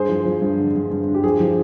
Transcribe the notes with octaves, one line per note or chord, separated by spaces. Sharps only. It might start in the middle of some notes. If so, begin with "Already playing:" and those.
Already playing: G2 G#4 C5
F3
F3
G2
D3
G2
G2
D3
G4
F3 G#4
F3